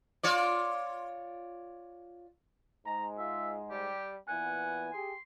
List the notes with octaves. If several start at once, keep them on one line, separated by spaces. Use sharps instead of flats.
F4 C#5 D5
G#2 G#3 A#5
F4 E5
G3 G4
A#2 E3 B3 F#5 G#5
G4 G#4 C6